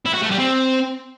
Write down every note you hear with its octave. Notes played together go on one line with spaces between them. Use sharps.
E4
F#4
A3
G3
C4